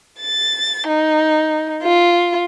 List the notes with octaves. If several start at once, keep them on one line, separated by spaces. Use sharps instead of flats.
A6
D#4
F4